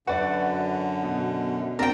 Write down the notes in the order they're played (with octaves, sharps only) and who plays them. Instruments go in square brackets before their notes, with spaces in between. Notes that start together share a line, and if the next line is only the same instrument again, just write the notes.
[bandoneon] F#2 D3 [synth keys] F#4 [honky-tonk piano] B4 D5 E5
[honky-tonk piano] B2
[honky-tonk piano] C4 D4 [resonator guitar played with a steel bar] A#4 G5